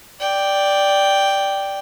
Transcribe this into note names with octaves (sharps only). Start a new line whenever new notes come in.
D5 G5